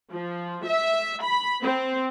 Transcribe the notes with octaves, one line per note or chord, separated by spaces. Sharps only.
F3
E5
B5
C4